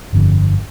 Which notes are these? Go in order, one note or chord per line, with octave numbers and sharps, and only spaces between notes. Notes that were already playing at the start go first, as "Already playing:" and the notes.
G1 F2 D3